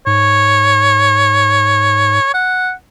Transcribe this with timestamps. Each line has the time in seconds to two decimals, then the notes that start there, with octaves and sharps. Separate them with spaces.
0.06 G#2 C#5
2.34 F#5